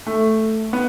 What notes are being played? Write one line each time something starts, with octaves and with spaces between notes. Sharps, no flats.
A3
B3